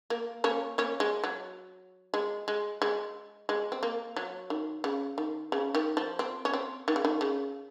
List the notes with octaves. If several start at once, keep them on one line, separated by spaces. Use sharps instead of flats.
A#3
A#3 C#4
A#3 C#4
G#3
F#3
G#3
G#3
G#3
G#3
C4
A#3
F#3
D#3
C#3
D#3
C#3
D#3
F3
C4
C#4
C4
D#3
C#3
D#3
C#3